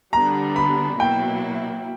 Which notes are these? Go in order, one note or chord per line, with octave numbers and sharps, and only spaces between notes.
D3 G3 B3 D4 A#5
B5
B2 F#3 A#3 E4 G5